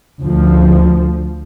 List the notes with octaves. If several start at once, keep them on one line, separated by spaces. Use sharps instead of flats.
D2 F3